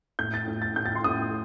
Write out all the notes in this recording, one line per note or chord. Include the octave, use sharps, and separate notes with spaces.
A2 G6
A6
A2
A6
A2 G6
A6
C6
A2 D#6